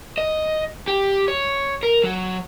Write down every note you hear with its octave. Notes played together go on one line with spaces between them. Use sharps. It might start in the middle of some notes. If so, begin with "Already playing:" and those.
D#5
G4
C#5
A#4
F#3